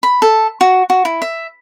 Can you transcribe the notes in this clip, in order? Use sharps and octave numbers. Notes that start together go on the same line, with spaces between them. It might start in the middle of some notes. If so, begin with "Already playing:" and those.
B5
A4
F#4
F#4
E4
E5